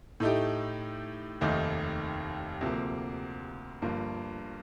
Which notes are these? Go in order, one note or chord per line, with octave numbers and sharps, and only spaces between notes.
A2 A3 D#4 G4
F1 D#2 D#3 A3 D#4
D2 C3 F3 A#3
G1 G2 F3 A#3